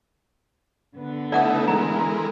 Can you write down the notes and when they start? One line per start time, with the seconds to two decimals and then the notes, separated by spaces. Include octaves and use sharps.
0.96 D3 B3
1.32 A3 D#4 E4 A4 D5 F#5 D#6
1.68 E3 G#3 A4 A#4 A#5